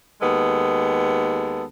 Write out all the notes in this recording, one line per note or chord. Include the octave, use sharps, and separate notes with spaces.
D#2 G#3 B3 A4